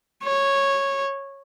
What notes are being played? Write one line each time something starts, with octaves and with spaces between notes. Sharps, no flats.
C#5